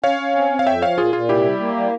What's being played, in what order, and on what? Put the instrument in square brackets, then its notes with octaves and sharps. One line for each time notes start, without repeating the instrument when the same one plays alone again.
[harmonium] C#4 [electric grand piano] C#5 F5
[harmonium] C#4
C4
C4
[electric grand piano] F5
[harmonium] F2 [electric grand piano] E5 G5
[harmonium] F3 [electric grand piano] C#5 F5
[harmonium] A#2 [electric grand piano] F4 G#4
[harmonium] A#2 [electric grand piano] F4
[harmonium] C3 [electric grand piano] E4 G4
[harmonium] G3
A#3
G3